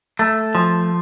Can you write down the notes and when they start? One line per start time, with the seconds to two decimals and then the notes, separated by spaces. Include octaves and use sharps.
0.19 A3
0.55 F3